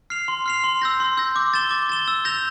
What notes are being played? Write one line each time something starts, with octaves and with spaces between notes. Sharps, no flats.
F6 C7 F7
C6
F6 C7 F7
C6
E6 G6 A#6
C6
E6 G6 A#6
D6
A6 E7 G7
D6
A6 E7 G7
E6
G6 A#6 F7